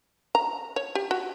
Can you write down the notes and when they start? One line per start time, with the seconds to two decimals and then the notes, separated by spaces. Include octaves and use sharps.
0.35 A#5
0.76 C#5
0.95 G4
1.11 F#4